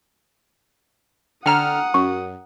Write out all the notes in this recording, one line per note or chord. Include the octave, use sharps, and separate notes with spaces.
D3 F#5 G5 A#5 D#6 F6
F#2 C#6